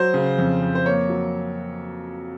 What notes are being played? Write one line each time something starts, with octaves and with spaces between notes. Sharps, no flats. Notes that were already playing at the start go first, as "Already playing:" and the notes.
Already playing: F#3 C5
C#3
F2
F2
C5
A#3 C#5
F#3